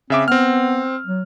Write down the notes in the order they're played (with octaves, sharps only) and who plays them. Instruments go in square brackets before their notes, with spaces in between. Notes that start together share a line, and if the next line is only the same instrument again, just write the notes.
[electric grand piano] C#3 E5 D6 [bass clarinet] C4
[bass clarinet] B3 [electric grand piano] C4 F6
[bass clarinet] F#3